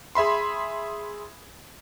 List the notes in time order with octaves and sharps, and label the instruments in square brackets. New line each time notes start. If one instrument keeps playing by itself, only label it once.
[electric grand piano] G#4 E5 B5 C6